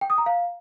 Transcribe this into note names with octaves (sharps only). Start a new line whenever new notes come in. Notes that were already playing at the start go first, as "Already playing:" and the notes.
G5
D#6
A#5
F5